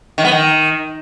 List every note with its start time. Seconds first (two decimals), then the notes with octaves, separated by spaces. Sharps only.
0.18 D#3
0.25 B3
0.31 D#3